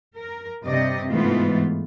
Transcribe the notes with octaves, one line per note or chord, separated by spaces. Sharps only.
A#4
G2 C3 G3 D5 D#5
G#2 E3 G#3 A3 B3 F4